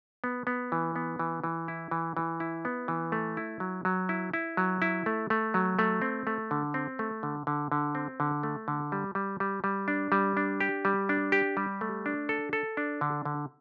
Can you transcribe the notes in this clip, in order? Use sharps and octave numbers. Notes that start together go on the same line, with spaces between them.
B3
B3
E3
B3
E3
E3
E4
E3
E3
E4
B3
E3
A3
E4
F#3
F#3
E4
E4
F#3
E4
A3
A3
F#3
A3
C4
A3
D3
C4
A3
D3
D3
D3
C4
D3
A3
D3
G3
G3
G3
G3
D4
G3
D4
G4
G3
D4
G4
G3
A3
D4
A4
A4
D4
D3
D3